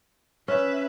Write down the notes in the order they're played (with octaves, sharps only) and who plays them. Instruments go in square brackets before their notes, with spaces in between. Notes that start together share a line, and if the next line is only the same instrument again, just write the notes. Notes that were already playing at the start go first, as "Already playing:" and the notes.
[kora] C#4 [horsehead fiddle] B4 E5